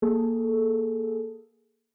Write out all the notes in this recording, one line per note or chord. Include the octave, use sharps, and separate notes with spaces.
A#3 G#4 A4